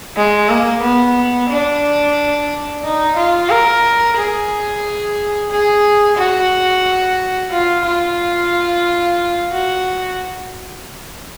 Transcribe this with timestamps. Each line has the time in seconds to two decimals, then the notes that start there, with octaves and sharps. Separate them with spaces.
0.16 G#3
0.50 A#3
0.83 B3
1.50 D4
2.84 D#4
3.17 F4
3.50 A#4
4.17 G#4
5.51 G#4
6.18 F#4
7.52 F4
7.85 F4
9.52 F#4